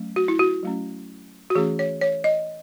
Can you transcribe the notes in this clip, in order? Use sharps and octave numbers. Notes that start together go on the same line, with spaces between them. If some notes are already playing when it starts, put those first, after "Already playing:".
Already playing: F#3 A3 C#4
F#4
E4
F#4
F#3 A3 C#4
F#4
E3 A3 C#4 G#4
C#5
C#5
D#5